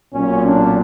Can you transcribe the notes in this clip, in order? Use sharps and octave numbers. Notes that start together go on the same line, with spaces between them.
B1 A#2 F#3 C#4
D4